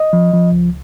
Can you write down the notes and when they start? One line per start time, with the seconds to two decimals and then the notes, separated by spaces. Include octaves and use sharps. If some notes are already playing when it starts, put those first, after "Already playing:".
Already playing: D#5
0.13 F3
0.33 F3
0.52 C#2